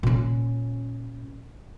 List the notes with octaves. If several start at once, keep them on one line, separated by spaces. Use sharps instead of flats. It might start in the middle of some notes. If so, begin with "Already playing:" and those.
A#2 C#4